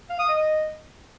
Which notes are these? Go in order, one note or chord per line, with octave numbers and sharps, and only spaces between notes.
F5
D#6
D#5